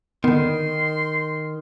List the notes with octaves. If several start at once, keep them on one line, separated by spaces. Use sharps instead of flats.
D3 D#3 B3 C6